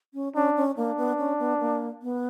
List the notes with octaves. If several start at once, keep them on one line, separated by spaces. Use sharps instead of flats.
C#4
C#4 D4
C#4
A#3 D4
B3
C#4
B3
A#3
B3